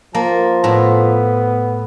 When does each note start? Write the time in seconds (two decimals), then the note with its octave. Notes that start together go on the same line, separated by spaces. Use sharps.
0.15 F3 A#3 A5
0.64 A2 B3